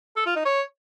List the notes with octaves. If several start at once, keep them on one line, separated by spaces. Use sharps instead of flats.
A4
F4
D#4
C#5